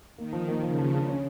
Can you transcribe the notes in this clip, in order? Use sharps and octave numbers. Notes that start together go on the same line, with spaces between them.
D#3 A#3
F3
A#3
C#3 F3
F3
D4
C#4